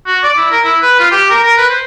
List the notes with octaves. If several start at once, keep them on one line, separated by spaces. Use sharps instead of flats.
F#4
D5
E4
A#4
E4
B4
F4
G4
A#4
A#4
B4
C5